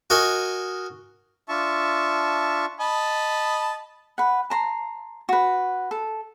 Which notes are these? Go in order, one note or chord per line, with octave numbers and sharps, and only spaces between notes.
F#4 A#4 D#5 G#5
D4 F4 E5 A5 C#6
D#5 A5 B5
B4 F#5
A5 A#5 C6
F#4 B4
A4